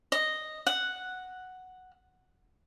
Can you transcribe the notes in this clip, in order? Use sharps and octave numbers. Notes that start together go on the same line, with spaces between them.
D#5
F#5